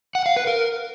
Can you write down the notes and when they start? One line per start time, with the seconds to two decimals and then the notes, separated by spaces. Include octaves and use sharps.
0.15 F#5
0.26 F5
0.36 B4
0.47 A#4